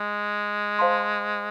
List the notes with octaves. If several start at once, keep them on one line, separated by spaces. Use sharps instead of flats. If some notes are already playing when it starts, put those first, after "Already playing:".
Already playing: G#3
C5 F5 A5 C6